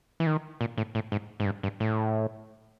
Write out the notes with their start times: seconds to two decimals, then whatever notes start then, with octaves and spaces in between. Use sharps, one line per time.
0.20 E3
0.27 D#3
0.61 A#2
0.78 A2
0.95 A2
1.12 G#2
1.40 G#2
1.45 G2
1.63 G2
1.80 A2